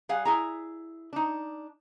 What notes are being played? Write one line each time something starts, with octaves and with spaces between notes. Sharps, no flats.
G3 G#4 F5 F#5
E4 G#4 A#5
D4 D#4